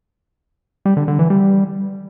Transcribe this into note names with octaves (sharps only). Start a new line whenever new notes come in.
G3
D3
D3
E3
G3